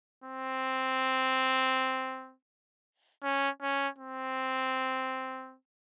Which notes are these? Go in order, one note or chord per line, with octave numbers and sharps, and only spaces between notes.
C4
C#4
C#4
C4